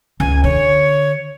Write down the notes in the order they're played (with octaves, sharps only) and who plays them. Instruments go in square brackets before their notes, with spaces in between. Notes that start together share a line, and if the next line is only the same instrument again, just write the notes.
[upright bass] C#2 [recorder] G#5
[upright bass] D3 [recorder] C#5